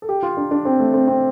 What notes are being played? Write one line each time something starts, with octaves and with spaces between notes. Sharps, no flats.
A4
G4
F4
D4
D4
C4
A3
C4
C4